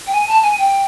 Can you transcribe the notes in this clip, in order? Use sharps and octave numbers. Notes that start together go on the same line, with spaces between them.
G5
G#5
A5
G#5
G5